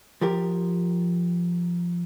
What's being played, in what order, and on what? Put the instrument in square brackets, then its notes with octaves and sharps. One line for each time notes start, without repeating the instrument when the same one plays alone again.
[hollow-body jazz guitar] F3 G4 A#4